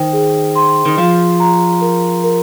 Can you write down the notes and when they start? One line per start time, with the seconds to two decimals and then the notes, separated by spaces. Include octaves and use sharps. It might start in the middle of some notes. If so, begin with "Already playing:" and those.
Already playing: D#3 C5 G5
0.13 G#4
0.55 C6
0.86 D#3
0.98 F3 F5
1.40 A#5
1.81 A#4
2.24 A#4